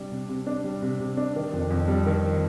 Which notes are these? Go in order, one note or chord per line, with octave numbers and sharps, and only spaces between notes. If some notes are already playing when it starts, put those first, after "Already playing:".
Already playing: C3 G3 D4
C3
C3
D4
G3
C3
C3
D4
D#3
F2
F2
G3
D#3